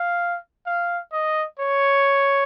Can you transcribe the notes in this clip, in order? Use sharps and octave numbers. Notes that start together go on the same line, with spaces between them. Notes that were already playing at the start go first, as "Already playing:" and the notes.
Already playing: F5
F5
D#5
C#5